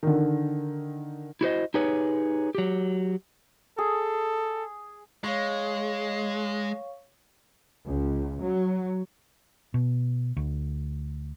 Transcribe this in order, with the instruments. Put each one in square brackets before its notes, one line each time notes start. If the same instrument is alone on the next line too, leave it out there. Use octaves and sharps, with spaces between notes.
[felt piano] D3 D#3
[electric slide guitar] E4 F#4 C5 D#5
D#4 G4 G#4 B4 C#5
F#3 G4
[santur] G#4 [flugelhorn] A4
[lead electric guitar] G#3 [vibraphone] C#5 F5 C#6
[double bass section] C#2
F#3
[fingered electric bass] B2
D2